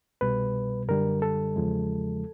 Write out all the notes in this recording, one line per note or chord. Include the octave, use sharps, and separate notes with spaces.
C2 B2 G3 B4
F#2 D3 G3 A#4
A4
E2 C#3 F3 G#3